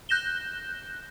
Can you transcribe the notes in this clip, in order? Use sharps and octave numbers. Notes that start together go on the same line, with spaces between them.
F#6 G6 A#6 E7 G7